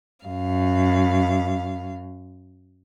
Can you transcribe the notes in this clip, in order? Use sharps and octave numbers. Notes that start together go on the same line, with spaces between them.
F#2 F5